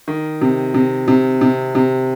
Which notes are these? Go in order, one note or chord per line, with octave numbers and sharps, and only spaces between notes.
D#3
C3
C3
C3
C3
C3